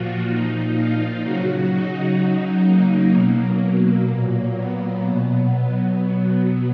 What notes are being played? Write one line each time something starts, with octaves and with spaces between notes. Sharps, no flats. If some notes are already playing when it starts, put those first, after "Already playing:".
Already playing: A#2 F3 F4 F#4
A#2 F3 D#4
F4
C#3 F#3 F#4
D#4
C#3 F#3
A#3
B2 F#3
A#2 F#3 A#3
B3
B2 F#3